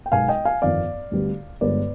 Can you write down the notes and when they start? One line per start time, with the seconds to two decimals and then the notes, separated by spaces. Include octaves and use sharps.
0.06 G5
0.12 B1 B2 G#3 B3 F5 G#5
0.28 D#5 G5
0.45 F5 G#5
0.62 G1 F2 D#3 B3 D5 F5
1.11 D2 D3 G3 B3
1.61 G1 G2 D3 G#3 B4 D5